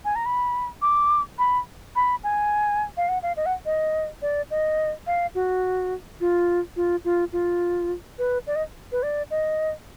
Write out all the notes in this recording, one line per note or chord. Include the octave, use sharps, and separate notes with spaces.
G#5
A#5
B5
D6
B5
B5
G#5
F5
F#5
F5
D#5
F#5
D#5
D5
D#5
F5
F#4
F4
F4
F4
F4
B4
D5
D#5
B4
D5
D#5